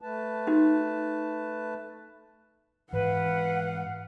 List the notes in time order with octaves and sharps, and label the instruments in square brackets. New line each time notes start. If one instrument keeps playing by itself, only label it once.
[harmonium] A3 B4 A5
[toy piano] D#4 F#4
[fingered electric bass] G#2 E3 [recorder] B4 [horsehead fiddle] F5 F#5